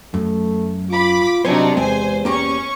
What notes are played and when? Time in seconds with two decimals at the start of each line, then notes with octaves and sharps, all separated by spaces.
0.14 F#2 A3
0.90 F4 B5 D6
1.45 C3 F#3 D4 D#4 C5 C#5 G#5
1.77 E2 G#3 G4 C5 G#5
2.25 A#3 C#4 G4 A#5 C#6